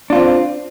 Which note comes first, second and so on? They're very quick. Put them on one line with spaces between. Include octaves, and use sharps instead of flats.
D4 F4 C4